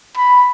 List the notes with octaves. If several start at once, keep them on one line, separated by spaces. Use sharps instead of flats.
B5